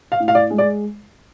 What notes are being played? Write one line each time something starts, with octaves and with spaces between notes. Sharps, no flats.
F5
A2
F5
D5
G#3
D5